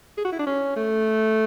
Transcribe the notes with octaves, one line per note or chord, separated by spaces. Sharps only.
G#4
F#4
E4
D4
C#4
A3